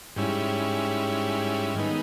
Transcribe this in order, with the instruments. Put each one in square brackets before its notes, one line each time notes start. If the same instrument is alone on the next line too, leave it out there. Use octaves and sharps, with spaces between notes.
[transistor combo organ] G#2 G3 C#4 E4
D#3 G#3 B3 D#4